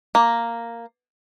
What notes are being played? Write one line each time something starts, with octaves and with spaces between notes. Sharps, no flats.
A#3